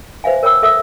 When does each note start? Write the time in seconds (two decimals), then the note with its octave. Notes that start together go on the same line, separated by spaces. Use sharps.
0.24 B4 C5 E5 F5 G#5
0.43 A#4 C#5 G5 B5 E6
0.62 A4 E5 D#6 E6